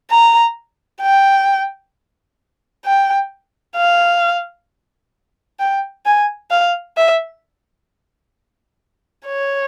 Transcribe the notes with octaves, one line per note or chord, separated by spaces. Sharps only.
A#5
G5
G5
F5
G5
G#5
F5
E5
C#5